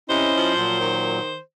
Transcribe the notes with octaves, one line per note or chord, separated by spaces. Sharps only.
C3 C#4 E4 C5 D#5
F3
A#2 F#3
D#3